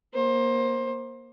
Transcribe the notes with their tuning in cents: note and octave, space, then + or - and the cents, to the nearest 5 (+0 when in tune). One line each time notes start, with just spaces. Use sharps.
A#3 +20 C5 +20